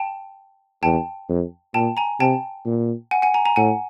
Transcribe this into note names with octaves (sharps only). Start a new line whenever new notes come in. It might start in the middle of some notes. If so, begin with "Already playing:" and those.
Already playing: G5 A5
E2 G5 A5
F2
A#2 G5 A5
G#5 A#5
C3 G5 A5
A#2
F#5 G#5
F#5 G#5
G#5 A#5
G#5 A#5
A2 F#5 G#5